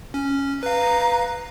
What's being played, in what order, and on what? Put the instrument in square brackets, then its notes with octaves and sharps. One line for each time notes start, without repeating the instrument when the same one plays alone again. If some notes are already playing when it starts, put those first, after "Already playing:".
[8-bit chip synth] C#4
[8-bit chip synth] B4 F5 [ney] A#5